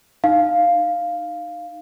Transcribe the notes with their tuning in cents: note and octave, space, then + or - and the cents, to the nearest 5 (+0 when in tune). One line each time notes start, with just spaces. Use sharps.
D#4 -15 F5 +0